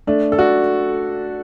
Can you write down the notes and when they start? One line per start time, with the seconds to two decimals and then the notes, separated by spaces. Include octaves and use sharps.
0.07 A3 D4
0.32 A4
0.38 D4 F#4